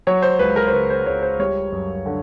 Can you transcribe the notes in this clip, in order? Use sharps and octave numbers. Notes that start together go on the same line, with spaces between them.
F#3 C#5
C5
C#2 B4
A#4
C5
C#3 B4
C5
C#2 C#5
C5
G3 C#5
F#2
D3